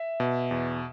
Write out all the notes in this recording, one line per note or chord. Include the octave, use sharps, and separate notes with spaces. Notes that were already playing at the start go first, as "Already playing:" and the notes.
Already playing: E5
B2
E2